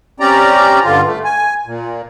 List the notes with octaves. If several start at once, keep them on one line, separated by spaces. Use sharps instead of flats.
C4 C#4 G4 D5 A#5
G2 D3 F4
A3
G#5
A#2